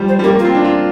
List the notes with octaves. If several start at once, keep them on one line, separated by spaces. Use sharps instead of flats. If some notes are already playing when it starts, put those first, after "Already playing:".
Already playing: F3 G3
C5
G3
A#3 G4
A#3 F4
C4
D4
F4